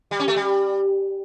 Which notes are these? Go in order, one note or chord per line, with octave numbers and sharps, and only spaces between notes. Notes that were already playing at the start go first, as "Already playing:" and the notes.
G3
C#4
A3
G3